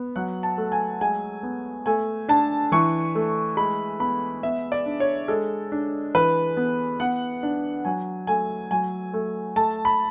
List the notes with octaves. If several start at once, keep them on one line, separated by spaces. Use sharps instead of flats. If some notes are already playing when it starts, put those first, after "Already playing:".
Already playing: B3
F#3 F#5
A5
A3
G#5
G#3 G#5
B3
A3 G#5
D4 A5
E3 C#6
A3
G#3 B5
B3 B5
B3 E5
D5
D4
C#5
G#3 A4
D4
E3 B4
B3
B3 F#5
D4
F#3 G#5
A3 G#5
F#3 G#5
A3
A3 A5
B5